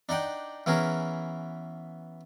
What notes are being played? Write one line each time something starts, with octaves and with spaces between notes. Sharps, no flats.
D4 D#4 F#5 G5
E3 B3 C#4 G#4 A#4